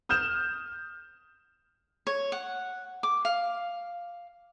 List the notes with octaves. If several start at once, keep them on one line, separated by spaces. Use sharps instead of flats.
D#6 F6 G6 E7
C#5
F#5
D6
F5